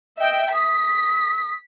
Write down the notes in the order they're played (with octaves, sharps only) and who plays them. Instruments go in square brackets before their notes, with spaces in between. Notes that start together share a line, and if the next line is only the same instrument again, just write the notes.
[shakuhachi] D#5 [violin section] E5 G5
[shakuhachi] D#6 [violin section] B6